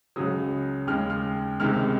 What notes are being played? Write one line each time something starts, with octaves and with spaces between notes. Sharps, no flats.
C#2 C#3 F#3 D#6
D#2 C#3 G#3 F6
F6
C#2 C3 D#3 G#3 F6